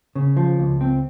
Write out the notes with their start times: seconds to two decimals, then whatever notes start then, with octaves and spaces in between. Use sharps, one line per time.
0.15 C#3
0.36 F3
0.59 C#2
0.81 C4